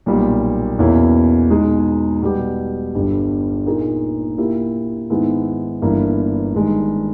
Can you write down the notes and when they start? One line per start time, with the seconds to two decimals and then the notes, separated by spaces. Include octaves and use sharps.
0.06 B1 A#2 G3 A#3
0.79 E2 B2 A#3 C#4 E4
1.50 B2 G#3 D#4 G#4
2.22 B2 G3 B3 G4
2.95 G1 G2 G3
3.66 A#2 A#3 D#4 G#4
4.37 A#2 A#3 E4 G4
5.10 G#2 D#3 G#3 B3 E4
5.82 G1 G2 E3 A#3 E4
6.54 G1 G2 D#3 G#3